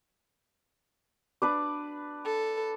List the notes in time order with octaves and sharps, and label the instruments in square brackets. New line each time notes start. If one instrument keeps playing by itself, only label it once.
[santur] D4 B4 D5
[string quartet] A4